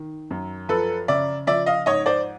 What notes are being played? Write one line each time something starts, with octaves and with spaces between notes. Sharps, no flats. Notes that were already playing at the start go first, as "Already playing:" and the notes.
Already playing: D#3
F#2
F3 A4 B4
C#3 D5 E5
F3 D5 E5
D#5 F5
G#2 C#5 D#5
C5 D5